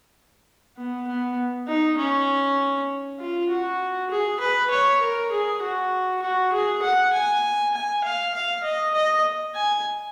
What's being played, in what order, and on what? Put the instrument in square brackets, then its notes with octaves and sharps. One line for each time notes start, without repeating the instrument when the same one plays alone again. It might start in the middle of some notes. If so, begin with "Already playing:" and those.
[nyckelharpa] B3
B3
D#4
C#4
F4
F#4
G#4
B4
C#5
A#4
G#4
F#4
F#4
G#4
F#5
G#5
G#5
F5
F5
D#5
D#5
G#5